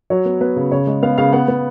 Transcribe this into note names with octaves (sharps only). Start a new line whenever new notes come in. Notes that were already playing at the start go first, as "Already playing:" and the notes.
F#3 C#5
B3
B3 B4
C#3
C#3 C#5
G#3
B3 F5
C#3 F5
B3 F#5
B3